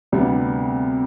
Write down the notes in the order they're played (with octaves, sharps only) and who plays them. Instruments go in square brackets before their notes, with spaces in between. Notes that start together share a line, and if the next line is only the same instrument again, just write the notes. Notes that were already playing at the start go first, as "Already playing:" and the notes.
[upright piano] D2 C3 G3 B3